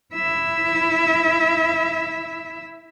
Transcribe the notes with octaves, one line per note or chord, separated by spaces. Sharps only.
E4 E5